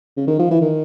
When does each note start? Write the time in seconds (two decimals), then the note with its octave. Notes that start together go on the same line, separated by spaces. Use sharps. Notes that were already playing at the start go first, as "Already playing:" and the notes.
0.17 C#3
0.27 D#3
0.39 F3
0.50 E3
0.61 D#3